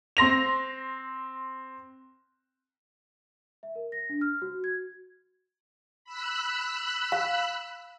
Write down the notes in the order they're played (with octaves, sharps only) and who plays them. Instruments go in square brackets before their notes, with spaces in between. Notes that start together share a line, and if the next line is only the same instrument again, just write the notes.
[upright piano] C4 C6 A#6 F7
[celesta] E5
A#4
A#6
D4
F6
F#4
G#6
[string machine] B5 E6 F#6
[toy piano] F5